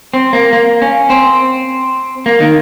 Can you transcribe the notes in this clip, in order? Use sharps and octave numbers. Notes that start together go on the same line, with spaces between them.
C4
A#3
A#3
C#4
C4
A#3
D#3